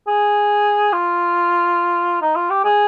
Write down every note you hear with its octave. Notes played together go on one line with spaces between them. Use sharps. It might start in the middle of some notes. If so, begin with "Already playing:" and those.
G#4
F4
D#4
F4
G4
G#4